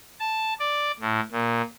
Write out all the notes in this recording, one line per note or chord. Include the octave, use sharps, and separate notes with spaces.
A5
D5
A2
A#2